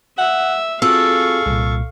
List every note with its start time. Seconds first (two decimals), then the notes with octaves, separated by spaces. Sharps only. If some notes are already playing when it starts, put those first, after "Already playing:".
0.18 E5 F#5
0.82 C4 F4 F#4 G#4 A4 F5 C#6
1.46 C2 A#2